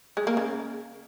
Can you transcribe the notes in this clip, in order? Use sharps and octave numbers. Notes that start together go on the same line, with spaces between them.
G#3
A#3
C#3